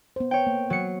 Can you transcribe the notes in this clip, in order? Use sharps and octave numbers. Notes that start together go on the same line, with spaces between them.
B3 C5
C#5 G5
A#3
F#3 C#7